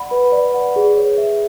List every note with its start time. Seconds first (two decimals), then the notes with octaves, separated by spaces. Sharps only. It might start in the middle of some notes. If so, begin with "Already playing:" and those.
Already playing: D5 F#5 B5
0.11 B4
0.32 D5
0.54 F#5
0.76 G#4
0.97 C#5
1.18 E5